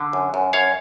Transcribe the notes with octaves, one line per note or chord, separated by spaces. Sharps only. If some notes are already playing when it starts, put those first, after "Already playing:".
Already playing: D3
F#2
F#2
F#2 C#5 F5